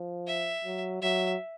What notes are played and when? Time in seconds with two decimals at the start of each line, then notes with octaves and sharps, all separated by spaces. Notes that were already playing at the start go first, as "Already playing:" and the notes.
Already playing: F3
0.27 E5
0.64 F#3
1.02 F#3 E5